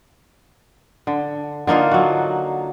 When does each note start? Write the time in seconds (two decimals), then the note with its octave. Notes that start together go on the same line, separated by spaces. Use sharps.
1.07 D3
1.67 D3 A#3 D#4 F4
1.91 F#3 F#4